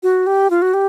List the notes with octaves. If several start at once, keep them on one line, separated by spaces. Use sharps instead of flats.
F#4
G4
F4
F#4
G4